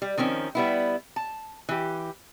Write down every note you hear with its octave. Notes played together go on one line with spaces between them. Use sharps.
G3
D#3 F3 C4 C#4
G3 B3 E4
A5
E3 G4